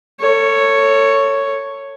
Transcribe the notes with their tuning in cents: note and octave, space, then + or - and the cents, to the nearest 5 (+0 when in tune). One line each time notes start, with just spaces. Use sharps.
A4 +35 C#5 +0